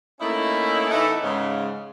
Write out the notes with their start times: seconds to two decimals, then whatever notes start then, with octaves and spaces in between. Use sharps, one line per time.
0.20 A3 A#3 C#4 D#4 E4
0.91 A2 E3 A3 B3 D#4 E4
1.22 G#2 C#3